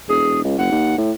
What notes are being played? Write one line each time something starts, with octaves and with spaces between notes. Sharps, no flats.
E1 G#4
C#2
F#1 F#5
D#2
A2